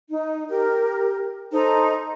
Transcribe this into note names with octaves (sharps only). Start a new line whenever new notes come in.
D#4
G4 A#4
D#4 A4 C5 A#5